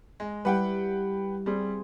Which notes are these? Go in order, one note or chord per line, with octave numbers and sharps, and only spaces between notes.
G#3
G3 E4 B4 F#5 G5
G3 C4 G#4 C5